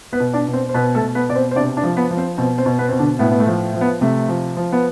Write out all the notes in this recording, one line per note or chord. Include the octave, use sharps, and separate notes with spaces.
B3 B4
B2
D4 D5
B2
C4 C5
C5
B2 B3 B4
A3 A4
B2
B3 B4
B2 D5
C4 C5
C5
C3 D4 D5
D4 D5
F3
B3 B4
F3
C4 C5
B2 C4 C5
C4 C5
B2
B3 B4
B2 C4
D3 D4
A2 B3
B3
A3
F3
F3
B3
C3 A3
F3
F3
B3